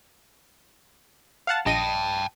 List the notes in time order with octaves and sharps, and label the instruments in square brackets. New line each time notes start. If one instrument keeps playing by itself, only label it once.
[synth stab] F5 F#5 A5
[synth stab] A#1 D#5 D#7 [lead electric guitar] G5 A5